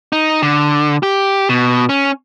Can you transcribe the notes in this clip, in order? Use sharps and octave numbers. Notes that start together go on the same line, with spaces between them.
D#4
D3
G4
B2
C#4